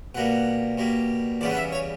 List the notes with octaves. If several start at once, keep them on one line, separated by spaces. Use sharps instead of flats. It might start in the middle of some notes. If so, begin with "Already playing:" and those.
B2 G3 A#3 F#5
B2 G3 A#3
E2 C#3 G3 B3 D5
F#5
E5
C#5